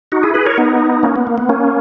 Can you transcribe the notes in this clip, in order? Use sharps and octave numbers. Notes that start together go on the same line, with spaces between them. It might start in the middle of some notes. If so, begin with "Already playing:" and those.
D#4 F#4
E4 G#4
G#4 B4
A#4 C#5
B3 D#4
A#3 C#4
B3
A#3
B3
A#3 C#4